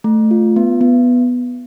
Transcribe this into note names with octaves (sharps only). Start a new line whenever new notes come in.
A3
F4
B3
B3